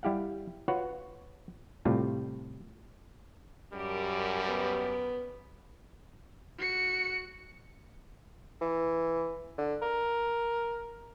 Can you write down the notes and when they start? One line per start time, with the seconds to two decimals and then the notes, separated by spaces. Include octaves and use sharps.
0.03 G3 E4 G4 F5 F#5
0.68 F4 F#4 B4 C#5 F#5
1.85 A2 C3 G3 F4
3.73 F#2 G3 G4 A#4
4.48 B3
6.58 F#4 C#7
8.61 E3
9.58 D3
9.82 A#4